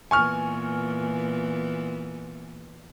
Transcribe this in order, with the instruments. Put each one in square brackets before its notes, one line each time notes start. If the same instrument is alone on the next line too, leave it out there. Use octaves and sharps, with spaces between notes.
[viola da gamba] A#2 E3 B3 [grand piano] G#5 C#6 F6